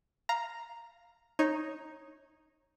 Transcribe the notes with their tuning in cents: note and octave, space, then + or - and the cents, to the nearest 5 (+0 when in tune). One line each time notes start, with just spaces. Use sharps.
F5 +0 A#5 +0
D#4 +0 C#5 -20